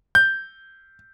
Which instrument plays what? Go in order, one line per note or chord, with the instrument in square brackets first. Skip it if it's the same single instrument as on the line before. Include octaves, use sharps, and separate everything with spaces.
[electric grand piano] G6